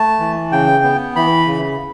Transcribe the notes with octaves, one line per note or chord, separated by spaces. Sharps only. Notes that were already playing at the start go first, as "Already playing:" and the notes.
Already playing: A3 A5
E3
C#3 G5
B3
E3 B5
C#3